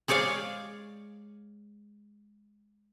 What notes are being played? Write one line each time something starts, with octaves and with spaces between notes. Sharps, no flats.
G#3 G#4 C#5 D5 F5